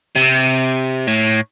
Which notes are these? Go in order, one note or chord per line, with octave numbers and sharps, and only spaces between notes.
C3
A2